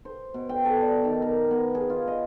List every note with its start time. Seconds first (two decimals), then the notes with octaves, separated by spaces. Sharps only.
0.05 C5
0.34 B2
0.49 G5
0.65 A4
0.81 D5
1.04 D#3
1.22 A#4
1.51 B3
1.75 G#4
1.90 F4
2.08 D#5